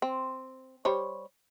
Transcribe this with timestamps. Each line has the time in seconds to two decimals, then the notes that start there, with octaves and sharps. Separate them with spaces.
0.02 C4
0.85 G3 C5 C#5